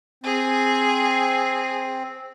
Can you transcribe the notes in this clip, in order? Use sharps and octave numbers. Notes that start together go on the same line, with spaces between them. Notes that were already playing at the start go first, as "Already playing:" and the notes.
C4 G#4